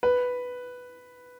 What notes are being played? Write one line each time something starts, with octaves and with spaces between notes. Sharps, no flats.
B4